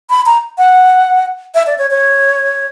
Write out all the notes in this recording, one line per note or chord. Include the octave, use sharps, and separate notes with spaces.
B5
A#5
F#5
E5
D5
C#5
C#5